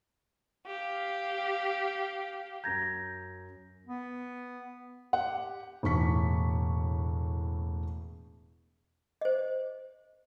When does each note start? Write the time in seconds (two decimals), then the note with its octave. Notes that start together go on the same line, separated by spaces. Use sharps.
0.66 G4 F5
2.64 F#2 A#5 G6 G#6 A#6
3.87 B3
5.13 G4 F#5
5.83 E1 A2 C#6 B6
9.21 C5 D#5